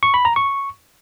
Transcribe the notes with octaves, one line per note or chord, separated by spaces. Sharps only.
C#6
B5
A#5
C#6